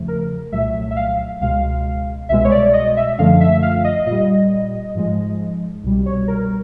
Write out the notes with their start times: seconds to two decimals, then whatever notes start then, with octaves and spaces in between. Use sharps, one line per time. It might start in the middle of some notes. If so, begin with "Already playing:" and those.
Already playing: E2 C#3 F3 A3
0.08 A#4
0.52 C2 A#2 F#3 A3 E5
0.91 E5
0.96 F5
1.41 C#2 B2 G#3 F5
2.29 C2 B2 G#3 E5
2.45 C#5
2.51 D5
2.73 D#5
2.97 E5
3.18 F#2 D3 F3 A3 F5
3.41 E5
3.62 F5
3.84 D#5
4.06 A#2 G3 D#5
4.95 G#2 F3 G#3
5.83 C2 B2 G3
6.06 C#5
6.28 A#4